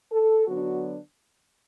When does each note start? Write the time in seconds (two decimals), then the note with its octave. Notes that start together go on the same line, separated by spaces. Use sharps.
0.12 A4
0.48 D3 F#3 B3 D4 F#4